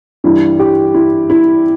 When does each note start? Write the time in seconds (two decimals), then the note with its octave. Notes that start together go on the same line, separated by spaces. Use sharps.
0.24 G2 E3 G3 E4
0.59 G4
0.94 E4
1.30 E4